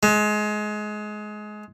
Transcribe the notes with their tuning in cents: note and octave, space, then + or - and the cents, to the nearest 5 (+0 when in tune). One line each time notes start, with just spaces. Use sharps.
G#3 +25